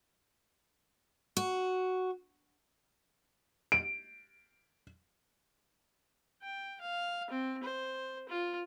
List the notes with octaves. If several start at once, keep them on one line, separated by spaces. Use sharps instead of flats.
F#4
D7
G5
F5
C4
C5
F4